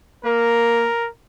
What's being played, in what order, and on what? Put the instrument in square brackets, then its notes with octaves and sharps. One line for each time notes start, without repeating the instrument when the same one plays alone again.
[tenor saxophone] A#3 [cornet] A#4